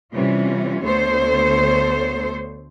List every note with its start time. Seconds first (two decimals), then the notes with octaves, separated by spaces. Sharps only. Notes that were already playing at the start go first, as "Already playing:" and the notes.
0.13 C3 E3 G3 C#4 F4
0.84 D2 B3 A4 C5 C#5